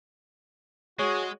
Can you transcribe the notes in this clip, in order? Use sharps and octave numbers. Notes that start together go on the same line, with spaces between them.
G#3 F#4 G#4 C#5 C#6